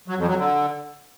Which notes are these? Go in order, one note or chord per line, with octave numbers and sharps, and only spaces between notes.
F#3
F2
F#3
D3